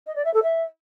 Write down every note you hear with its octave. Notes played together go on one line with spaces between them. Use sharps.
D#5
D5
E5
A4
E5